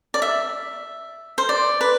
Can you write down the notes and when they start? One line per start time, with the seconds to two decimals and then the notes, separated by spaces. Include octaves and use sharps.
0.14 D5
0.22 E5
1.38 C5
1.49 D5
1.81 B4